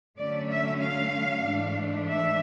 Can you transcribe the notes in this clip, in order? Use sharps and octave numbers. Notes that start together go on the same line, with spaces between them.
D3 F#3 A3 C#4 D5
E5
F5
G#2 E3 A3 D4
E5